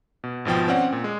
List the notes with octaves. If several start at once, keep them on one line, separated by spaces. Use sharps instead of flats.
B2
G#1 B2 F3 G5
C4 C#4 D5 F#5
A#2
G#3